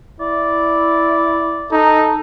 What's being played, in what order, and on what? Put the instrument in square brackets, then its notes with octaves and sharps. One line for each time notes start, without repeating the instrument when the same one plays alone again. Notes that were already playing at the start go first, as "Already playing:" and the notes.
[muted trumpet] E4 [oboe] D5
[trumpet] D#4 [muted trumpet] A4